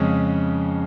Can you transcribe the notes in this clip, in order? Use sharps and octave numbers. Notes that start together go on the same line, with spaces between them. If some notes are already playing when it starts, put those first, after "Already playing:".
Already playing: F2 C#3 G#3 C#4